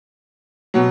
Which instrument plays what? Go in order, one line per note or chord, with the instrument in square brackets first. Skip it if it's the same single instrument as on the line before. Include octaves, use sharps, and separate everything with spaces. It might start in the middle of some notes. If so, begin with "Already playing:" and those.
[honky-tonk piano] B2 F#3